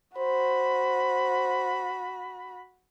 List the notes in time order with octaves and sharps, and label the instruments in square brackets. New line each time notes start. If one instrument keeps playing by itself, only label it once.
[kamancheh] F#4 B5 [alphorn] C5